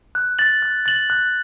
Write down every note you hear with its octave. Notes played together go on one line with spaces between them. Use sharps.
F#6
A6 F#7
F#6
A6 F#7
F#6